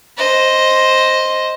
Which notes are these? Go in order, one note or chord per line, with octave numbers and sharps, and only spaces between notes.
C5 D#5